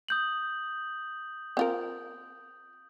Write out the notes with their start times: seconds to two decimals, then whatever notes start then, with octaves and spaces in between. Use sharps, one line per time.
0.09 D#6 G6 F#7
1.57 C4 F4 A#4